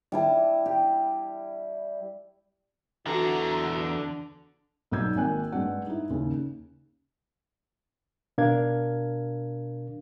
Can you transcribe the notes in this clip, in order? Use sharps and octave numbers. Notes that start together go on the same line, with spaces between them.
G3 E4 A5
G4
E2 D3 E3 F#4 A#5
B1 G3 D#4 E6 G6 G#6
G#1 A#3 G5 G#5 F#6
G2 G#3 F#5
D#4 E4
D#2 C#3
B2 D4 A#4 F5 G#6